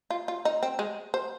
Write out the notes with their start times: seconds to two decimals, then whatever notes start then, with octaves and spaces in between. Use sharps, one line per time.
0.10 F4
0.28 F4
0.45 D#4
0.63 C4
0.79 G#3
1.14 C5